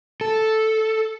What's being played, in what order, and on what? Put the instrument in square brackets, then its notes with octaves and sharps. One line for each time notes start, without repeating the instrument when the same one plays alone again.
[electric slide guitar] A4